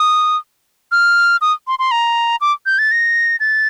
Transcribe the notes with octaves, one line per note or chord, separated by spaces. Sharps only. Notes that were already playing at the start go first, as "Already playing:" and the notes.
Already playing: D#6
F6
D#6
C6
C6
A#5
D6
G6
A6
A#6
A6